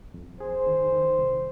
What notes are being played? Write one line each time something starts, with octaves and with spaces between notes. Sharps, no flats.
F2
G#4 C5
D#3
D#3
C2